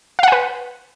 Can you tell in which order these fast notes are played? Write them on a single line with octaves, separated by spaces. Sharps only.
F5 F#5 G#5 B4